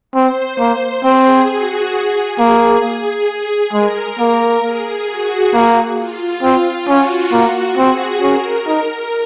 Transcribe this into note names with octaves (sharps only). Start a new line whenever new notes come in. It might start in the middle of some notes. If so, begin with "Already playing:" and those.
C4 C5
A#3
C4 G#4
F#4
G#4
A#3
G#4
G#4
G#3 A#4
A#3
G#4
F#4
A#3
F4
C4
C#4 F#4
A#3 F#4
C4 G#4
C#4 A#4
D#4